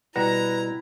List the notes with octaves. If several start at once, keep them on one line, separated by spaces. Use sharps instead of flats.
B2 G3 E4 B4 F#5 A#5 A#6